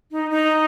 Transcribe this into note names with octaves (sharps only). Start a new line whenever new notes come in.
D#4
D#4